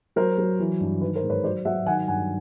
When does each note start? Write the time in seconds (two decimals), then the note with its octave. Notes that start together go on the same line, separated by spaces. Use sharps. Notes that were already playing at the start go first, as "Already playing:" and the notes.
0.16 F#3 A#4 C5
0.38 F#3
0.59 E3
0.81 G2
1.01 D#3 B4
1.16 A#4 C5
1.23 G#2
1.30 B4 C#5
1.44 F#3 C5 D5
1.65 F#3 E5 F#5
1.86 D#3 F#5 G#5
2.08 G2 F#5 G#5